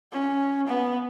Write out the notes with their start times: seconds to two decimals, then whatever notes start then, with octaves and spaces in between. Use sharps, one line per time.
0.12 C#4
0.67 B3